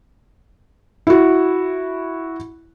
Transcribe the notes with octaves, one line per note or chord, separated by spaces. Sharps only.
E4 F#4